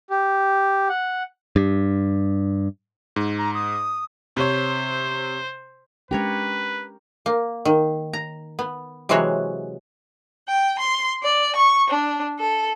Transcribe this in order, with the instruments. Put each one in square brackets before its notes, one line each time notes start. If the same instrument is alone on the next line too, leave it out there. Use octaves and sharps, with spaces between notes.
[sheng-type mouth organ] G4
F#5
[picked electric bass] G2
[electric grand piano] G#2
[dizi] A#5
D#6
[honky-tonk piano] C3 C#5 [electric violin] C5
[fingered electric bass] G#3 C#4 D4 [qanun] G4 A#4 C#5 [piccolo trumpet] B4
[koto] A#3
D#3
A#5
B3
C3 E3 F#3 G#3 F#4 C#5
[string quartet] G5
C6
D5
C#6
D4
A4